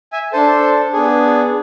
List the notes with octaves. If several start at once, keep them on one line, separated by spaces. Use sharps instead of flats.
E5 G#5
D4 A4 C5
B3 D4 G#4